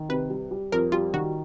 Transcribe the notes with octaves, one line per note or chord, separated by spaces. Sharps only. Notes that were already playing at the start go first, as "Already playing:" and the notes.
Already playing: D#3
C3 B4
G3
G3
F2 A#4
G3 F4
D#3 F#4